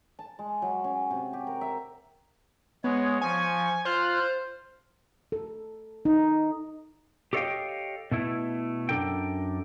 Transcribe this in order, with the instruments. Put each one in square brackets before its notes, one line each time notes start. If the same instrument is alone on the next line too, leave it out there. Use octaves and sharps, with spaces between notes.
[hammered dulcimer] A5
G#3
F#3
C#4
C3
G4
A#4
E5
[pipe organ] G#3 C#5 [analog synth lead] B3
[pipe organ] F3 C#6 [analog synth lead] G#5
[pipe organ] F4 F6 F#6 [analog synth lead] C5
[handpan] A4
D#4
[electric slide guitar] G4 A4 C#5 D#5 F5 G5
B2 A3 E4
F#2 D4 A4 A#4 G5